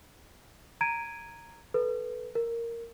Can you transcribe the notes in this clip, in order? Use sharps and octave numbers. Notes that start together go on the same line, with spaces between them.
A#5 G#6 D7 D#7
A4 B4
A#4